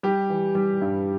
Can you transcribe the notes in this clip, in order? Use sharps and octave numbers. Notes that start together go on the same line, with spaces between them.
G3 G4
E3
G3
G2